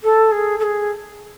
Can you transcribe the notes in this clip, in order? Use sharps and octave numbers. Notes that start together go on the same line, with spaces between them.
A4
G#4
A4
G#4